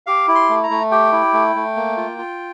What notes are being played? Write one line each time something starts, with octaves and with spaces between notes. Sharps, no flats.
G4 F5
E4
C6
A3
A#5
A3
G4 G5
E4
A3
A3
A#3
F4
F4